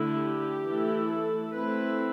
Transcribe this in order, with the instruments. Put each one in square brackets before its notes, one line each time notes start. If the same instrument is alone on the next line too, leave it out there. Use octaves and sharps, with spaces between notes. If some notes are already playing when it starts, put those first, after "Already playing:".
Already playing: [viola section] D3 A3 E4
G4
E3 A3 E4
A4
A3 C4 E4 B4